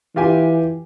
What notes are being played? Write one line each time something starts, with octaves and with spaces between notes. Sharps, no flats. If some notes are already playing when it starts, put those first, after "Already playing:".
E3 F4 G4 G#5